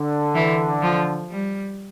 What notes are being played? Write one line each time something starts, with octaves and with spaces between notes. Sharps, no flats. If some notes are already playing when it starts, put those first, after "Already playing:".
Already playing: D3
E3
F3
G3